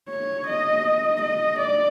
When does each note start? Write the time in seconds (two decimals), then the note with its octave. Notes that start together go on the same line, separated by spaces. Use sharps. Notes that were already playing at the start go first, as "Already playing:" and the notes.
0.09 C#5
0.47 D#5
1.22 D#5
1.59 D5